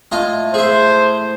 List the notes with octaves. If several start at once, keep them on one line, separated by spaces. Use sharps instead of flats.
A2 F4 D#5
G#4 C5 E5